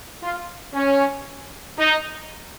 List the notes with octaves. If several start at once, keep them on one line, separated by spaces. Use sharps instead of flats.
F4
C#4
D#4